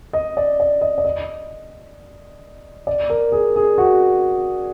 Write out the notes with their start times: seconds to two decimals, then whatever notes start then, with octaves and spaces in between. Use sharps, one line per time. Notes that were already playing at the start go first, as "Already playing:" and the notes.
0.13 D#5
0.37 D5
0.60 D5
0.81 D#5
0.98 D5
1.04 D#5
2.87 D5
3.09 A#4
3.32 G#4
3.56 G#4
3.78 F#4